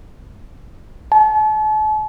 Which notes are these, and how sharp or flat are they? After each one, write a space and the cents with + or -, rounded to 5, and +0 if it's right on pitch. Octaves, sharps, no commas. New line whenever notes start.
A5 -40